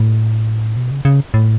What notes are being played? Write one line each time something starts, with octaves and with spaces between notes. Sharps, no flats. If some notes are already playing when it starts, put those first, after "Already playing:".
Already playing: A2
B2
C#3
C#3
A2